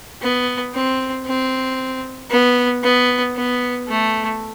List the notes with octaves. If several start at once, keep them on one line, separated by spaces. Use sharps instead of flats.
B3
C4
C4
B3
B3
B3
A3